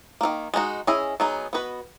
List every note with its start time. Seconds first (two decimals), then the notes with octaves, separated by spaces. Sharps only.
0.21 D#3 F#3 A#3
0.54 G#3 D#4 F#4
0.87 C#4 E4 G#4 D#5
1.20 F#3 B3 D#4 G#4
1.53 B3 F#4 B4 D#5